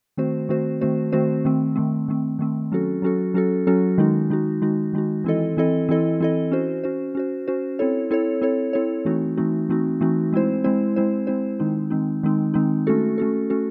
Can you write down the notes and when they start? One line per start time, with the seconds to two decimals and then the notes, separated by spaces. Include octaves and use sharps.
0.17 D#3 A3 C4 F#4 C5
0.49 D#3 A3 C4 F#4 C5
0.81 D#3 A3 C4 F#4 C5
1.12 D#3 A3 C4 F#4 C5
1.45 D#3 A3 C4
1.76 D#3 A3 C4
2.08 D#3 A3 C4
2.39 D#3 A3 C4
2.72 F#3 C#4 F#4 A4
3.02 F#3 C#4 F#4 A4
3.34 F#3 C#4 F#4 A4
3.67 F#3 C#4 F#4 A4
3.98 D#3 G#3 D#4 F#4
4.30 D#3 G#3 D#4 F#4
4.62 D#3 G#3 D#4 F#4
4.93 D#3 G#3 D#4 F#4
5.24 E3 C4 E4 A4 D#5
5.57 E3 C4 E4 A4 D#5
5.89 E3 C4 E4 A4 D#5
6.20 E3 C4 E4 A4 D#5
6.51 C#4 F#4 C5
6.84 C#4 F#4 C5
7.15 C#4 F#4 C5
7.48 C#4 F#4 C5
7.79 C4 E4 A4 C#5
8.11 C4 E4 A4 C#5
8.41 C4 E4 A4 C#5
8.73 C4 E4 A4 C#5
9.05 E3 A3 C4 D#4 F#4
9.37 E3 A3 C4 D#4 F#4
9.69 E3 A3 C4 D#4 F#4
10.01 E3 A3 C4 D#4 F#4
10.33 G#3 C4 E4 C5
10.64 G#3 C4 E4 C5
10.96 G#3 C4 E4 C5
11.27 G#3 C4 E4 C5
11.60 D#3 G#3 C4 D#4
11.90 D#3 G#3 C4 D#4
12.23 D#3 G#3 C4 D#4
12.54 D#3 G#3 C4 D#4
12.87 A3 C#4 F#4 A4
13.18 A3 C#4 F#4 A4
13.50 A3 C#4 F#4 A4